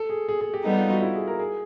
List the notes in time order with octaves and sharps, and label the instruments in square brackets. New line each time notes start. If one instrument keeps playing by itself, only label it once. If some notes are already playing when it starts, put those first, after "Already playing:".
Already playing: [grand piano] A4
G#4
G#4
G#4
G4
[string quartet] G3 B3 D#4 [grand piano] A4
[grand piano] F4
F#4
E4
G#4
A#4
G#4